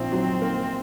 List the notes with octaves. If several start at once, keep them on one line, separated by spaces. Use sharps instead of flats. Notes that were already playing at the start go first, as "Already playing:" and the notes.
Already playing: A#1 G#2 C4
F#3
A#3